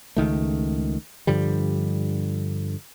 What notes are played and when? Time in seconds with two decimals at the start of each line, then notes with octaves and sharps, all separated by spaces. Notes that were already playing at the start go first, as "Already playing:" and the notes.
0.17 C#2 D#3 A3
1.27 G2 D3 F3 G3